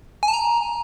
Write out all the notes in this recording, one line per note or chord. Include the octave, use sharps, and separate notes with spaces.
G#5
A5
A#5